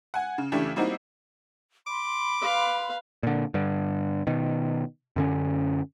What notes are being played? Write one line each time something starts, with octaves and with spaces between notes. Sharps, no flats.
F#5 G#5
C#3
C#3 E3 A3 D4 E4 G4
G3 A#3 C4 D#4 E4 F#4
B5 C6 D6
B4 F5
A#2 D3
G2 D3
B2 D#3
F#2 D3 C#4